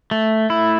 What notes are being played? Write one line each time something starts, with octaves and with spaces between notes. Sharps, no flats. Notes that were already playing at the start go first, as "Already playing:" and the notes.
A3
E4